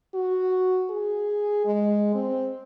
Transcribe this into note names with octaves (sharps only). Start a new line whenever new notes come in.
F#4
G#4
G#3
C4